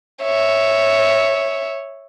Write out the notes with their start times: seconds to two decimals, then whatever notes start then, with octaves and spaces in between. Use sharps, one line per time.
0.23 C#5 E5